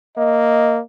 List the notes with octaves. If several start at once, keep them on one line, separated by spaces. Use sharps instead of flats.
A#3 D#5